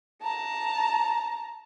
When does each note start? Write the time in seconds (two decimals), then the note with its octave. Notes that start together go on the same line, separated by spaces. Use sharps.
0.22 A5 A#5